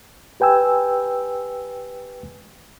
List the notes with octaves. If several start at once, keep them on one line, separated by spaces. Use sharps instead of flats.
G4 B4 G5 G#5 E6